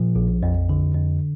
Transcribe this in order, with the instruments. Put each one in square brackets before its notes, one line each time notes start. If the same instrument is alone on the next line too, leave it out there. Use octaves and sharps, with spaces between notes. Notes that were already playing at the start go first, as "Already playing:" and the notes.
Already playing: [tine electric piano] A#2 F3
A#1
F2
D3
F2